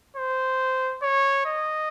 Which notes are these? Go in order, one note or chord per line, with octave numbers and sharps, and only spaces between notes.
C5
C#5
D#5